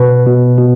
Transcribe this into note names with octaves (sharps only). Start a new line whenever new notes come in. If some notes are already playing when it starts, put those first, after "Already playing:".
Already playing: B2 B4
B2
B2